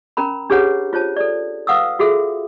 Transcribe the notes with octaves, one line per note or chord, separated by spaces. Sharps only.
C#4 A#4 A#5 B5
D4 G4 G#4 B4 C#5 F#5
F4 C5 C#5 A5
A4 D5
B4 F5 F#5 D#6 E6
F4 F#4 G#4 A4 E5